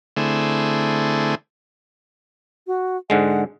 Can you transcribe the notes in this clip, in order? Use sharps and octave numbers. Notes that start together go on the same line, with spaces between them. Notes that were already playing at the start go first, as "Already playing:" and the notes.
D3 A3 C4 E4 G#4
F#4
G#2 D3 G#3 F#5